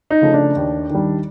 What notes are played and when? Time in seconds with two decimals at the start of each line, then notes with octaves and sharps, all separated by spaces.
0.10 D#4
0.22 C#3 F3 A3
0.34 D4
0.56 D#2
0.90 D#3 G3